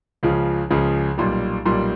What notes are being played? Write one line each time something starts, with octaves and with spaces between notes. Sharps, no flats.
C#2 C#3 F3
C#2 C#3 F3
B1 A#2 G3
B1 A#2 G3